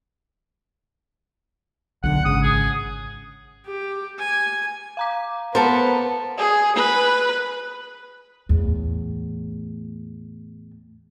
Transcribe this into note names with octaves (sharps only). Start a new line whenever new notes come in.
B1 D3 F#5
G#1 C#3 D#6
G#4
G4
G#5
F5 A#5 D6
B3 A4 A#4 C5
G#4
B4
E2 A2